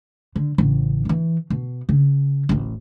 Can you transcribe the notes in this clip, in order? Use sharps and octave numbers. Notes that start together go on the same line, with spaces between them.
D3
A1 C#3
D#3 E3
B2
C#3
D1 A1